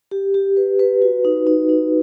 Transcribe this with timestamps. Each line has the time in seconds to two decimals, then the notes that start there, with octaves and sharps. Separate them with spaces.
0.11 G4
0.34 G4
0.57 B4
0.79 B4
1.02 F#4
1.25 D#4
1.47 D#4
1.69 D#4